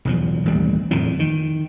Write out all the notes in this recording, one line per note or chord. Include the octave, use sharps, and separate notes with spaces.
B1 E2 F3
A1 D#2 G3
D1 F2 E3 F3
D#3